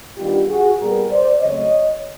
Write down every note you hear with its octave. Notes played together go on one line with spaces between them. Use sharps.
D#3 G3 B3 D4 F4 G4
F#4 G#4
A#2 G3 B3 G#4 A#4
C5 D5
C#3 F#3 A3 C4 C#5 D#5